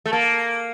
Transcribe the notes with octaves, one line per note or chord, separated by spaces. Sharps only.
A3
A#3